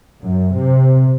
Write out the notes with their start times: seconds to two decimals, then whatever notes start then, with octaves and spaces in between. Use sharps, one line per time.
0.22 F#2
0.56 C3